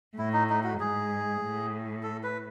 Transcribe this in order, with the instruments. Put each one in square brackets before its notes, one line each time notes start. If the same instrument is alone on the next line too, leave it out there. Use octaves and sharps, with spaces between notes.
[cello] A2 [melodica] E4
[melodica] D#4
D#4
F#4
[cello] G#2 [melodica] G#4
[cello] A2
[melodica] A4
B4